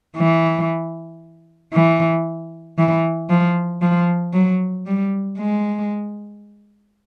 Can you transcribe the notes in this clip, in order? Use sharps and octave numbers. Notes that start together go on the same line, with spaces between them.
E3
E3
E3
F3
F3
F#3
G3
G#3